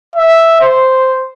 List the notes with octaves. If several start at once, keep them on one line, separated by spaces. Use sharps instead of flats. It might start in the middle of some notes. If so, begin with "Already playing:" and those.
E5
C5